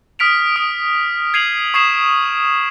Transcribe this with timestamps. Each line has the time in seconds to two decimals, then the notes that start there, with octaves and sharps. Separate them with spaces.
0.19 D#6 F6 B6 D7 F7
0.56 D#6 D7
1.34 G#6 C7 D#7 F7 F#7
1.74 C#6 D#6 G#6 C7 E7